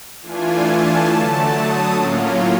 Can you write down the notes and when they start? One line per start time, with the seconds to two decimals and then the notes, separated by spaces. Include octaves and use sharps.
0.22 E3 A3 D4 F4 G#5
0.65 A5
1.08 D3 F#3 A3 A5
1.51 D#6
1.94 A2 F#3 A#3 C#4 F4